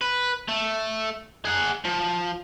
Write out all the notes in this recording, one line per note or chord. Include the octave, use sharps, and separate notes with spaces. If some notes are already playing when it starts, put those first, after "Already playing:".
B4
A3
G#4 F#5
F3